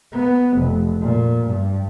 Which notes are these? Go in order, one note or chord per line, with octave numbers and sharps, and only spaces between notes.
B3
F1
A#2
G2